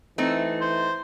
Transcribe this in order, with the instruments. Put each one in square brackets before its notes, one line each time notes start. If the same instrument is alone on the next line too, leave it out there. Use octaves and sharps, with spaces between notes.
[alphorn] E3 [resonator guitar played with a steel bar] A3 C4 D#4
[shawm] C5